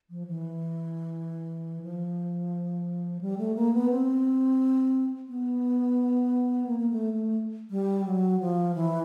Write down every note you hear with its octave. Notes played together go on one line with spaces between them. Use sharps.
F3
E3
F3
G3
A3
A#3
B3
C4
B3
A#3
A#3
A3
A3
G3
F#3
F3
E3